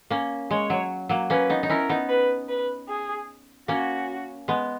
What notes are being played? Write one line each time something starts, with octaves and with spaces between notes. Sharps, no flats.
A#3 C#4
G#3 C#5
F#3
F#3 A#3
A#3 C#4 B4
B3 D#4
D#4
C#4 E4 A#4
B3 D#4
B4
B4
G#4
A#3 C#4 F#4
G#3 B3